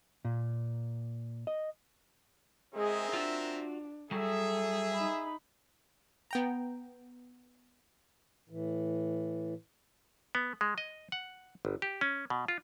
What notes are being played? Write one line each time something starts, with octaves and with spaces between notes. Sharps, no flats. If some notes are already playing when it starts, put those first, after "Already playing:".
A#2
D#5
G#3 C4 G#4 A#4 E5
D4 F4 F#4
F#3 G3 G#4 A4 E5
D#4 B5
B3 G5 A#5
A2 E3
B3
G#3
D#5
F#5
G1
G4
C#4
B2
F4